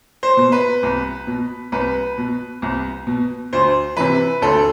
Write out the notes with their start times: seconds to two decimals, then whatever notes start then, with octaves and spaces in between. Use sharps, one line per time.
0.23 C5
0.37 B2
0.52 B4
0.83 C2
1.27 B2
1.72 C2 B4
2.18 B2
2.62 C2
3.07 B2
3.53 D2 C5
3.97 C3 E3 B4
4.42 D2 A4